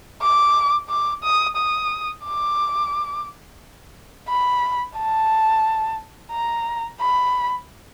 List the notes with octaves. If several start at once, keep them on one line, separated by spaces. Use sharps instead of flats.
D6
D6
D#6
D#6
D6
B5
A5
A#5
B5